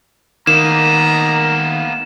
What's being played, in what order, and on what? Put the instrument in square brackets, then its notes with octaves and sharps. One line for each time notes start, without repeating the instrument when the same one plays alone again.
[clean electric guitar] D#3 [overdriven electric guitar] A#3 B3 [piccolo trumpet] A#5 [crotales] E7